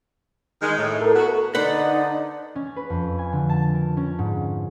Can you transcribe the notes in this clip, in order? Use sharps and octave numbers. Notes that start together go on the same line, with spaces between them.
D#3 G#3
A2
A4 A#4
B3 F#4
D3 D#4 B4 C5 D5 F#5
C#4
B4
F2
G#5
D3
A5
A#4
C#4
G#2